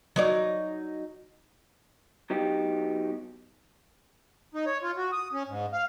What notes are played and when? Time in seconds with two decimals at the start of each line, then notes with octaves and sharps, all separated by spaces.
0.16 F#3 D#4 D5
2.30 F#3 B3 D#4 G4
4.55 D#4
4.66 C#5
4.83 F4
4.97 F#4
5.12 D#6
5.33 C#4
5.48 G#2
5.73 F5